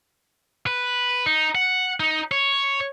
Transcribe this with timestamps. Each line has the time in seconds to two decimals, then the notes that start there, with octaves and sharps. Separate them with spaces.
0.67 B4
1.26 D#4
1.55 F#5
2.00 D#4
2.31 C#5